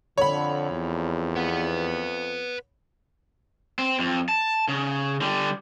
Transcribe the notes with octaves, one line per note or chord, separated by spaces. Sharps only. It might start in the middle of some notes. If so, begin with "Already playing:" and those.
F2 D3 C#5 B5
E2
B4 F#5
C4
F2
A5
C#3
D3 G3